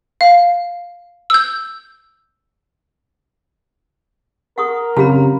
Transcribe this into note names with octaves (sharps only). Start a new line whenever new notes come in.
F5
E6 G6
A#4 F#5 C#6 D#6
F#2 C#3 C4 F4 G4 F5 A#5 B5